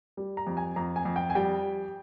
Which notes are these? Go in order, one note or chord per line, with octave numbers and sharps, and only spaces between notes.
G3
A#5
F2
G#5
F2 A#5
G#5
F2
G5
G#5
G3 G5